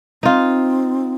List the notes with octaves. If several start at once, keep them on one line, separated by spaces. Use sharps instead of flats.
C4 D#4 F4